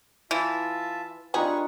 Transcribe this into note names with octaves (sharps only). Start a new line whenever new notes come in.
E3 F4 E5 A5
D4 D#4 F4 G4 G#4 B4 C#6